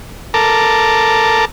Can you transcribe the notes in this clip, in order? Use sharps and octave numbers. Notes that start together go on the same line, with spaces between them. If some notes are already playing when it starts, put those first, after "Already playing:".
A4 A#4 A5 A#5 D6